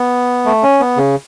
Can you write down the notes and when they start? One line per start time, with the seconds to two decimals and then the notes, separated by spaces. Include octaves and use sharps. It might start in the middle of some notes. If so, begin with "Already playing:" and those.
Already playing: B3
0.45 A3
0.63 C#4
0.80 B3
0.97 C#3